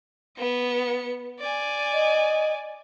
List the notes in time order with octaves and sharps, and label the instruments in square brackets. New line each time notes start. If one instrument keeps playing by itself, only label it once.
[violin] B3 C#7
D5 G#5
[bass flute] D#5